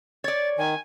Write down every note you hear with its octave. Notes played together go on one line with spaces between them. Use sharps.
C#5 D5 A6
D#3 G#5